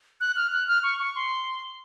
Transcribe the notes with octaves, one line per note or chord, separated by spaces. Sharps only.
F#6
F6
F#6
F6
C#6
C#6
C6